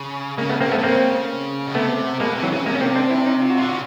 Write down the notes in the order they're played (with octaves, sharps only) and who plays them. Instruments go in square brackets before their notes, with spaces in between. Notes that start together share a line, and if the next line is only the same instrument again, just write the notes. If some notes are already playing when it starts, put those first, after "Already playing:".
Already playing: [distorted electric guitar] C#3
[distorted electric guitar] C#3 [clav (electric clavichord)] G#3 A#3
[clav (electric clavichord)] A3 B3
[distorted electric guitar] C#3 [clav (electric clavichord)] A#3 C4
[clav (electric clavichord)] A3 B3
[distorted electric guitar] C3
[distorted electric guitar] C#3 [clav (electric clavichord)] A#3 C4
[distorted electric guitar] B2
[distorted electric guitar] C3 [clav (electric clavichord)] A3 B3
[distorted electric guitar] B2 [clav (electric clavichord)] G#3 A#3
[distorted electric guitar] C3
[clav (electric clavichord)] E3 F#3
[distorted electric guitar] C#3
[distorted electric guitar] C3 [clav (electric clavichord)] G#3 A#3
[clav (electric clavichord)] C#4
A#3 C4
C4 D4
D4 E4
C#4 D#4
F4
F#4
[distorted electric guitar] D3 [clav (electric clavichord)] F4
[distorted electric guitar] C#3 [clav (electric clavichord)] F#4